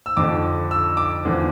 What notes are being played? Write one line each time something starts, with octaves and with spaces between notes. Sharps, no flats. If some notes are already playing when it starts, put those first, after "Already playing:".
E6
F2 D3 F3 D6
E6
D6
E2 D3 F3